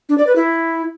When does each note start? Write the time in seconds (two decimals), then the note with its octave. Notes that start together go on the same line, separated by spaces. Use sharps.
0.09 D4
0.18 D5
0.27 B4
0.36 E4